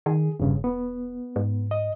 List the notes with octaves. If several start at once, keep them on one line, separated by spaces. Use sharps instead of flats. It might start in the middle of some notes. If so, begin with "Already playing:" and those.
D#3 G#4
E1 G2 C#3
B3
G#2
D#5